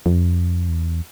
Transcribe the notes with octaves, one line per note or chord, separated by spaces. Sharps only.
F2
E2